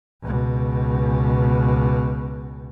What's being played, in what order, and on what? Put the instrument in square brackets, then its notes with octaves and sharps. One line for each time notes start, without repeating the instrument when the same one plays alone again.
[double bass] C#2 B2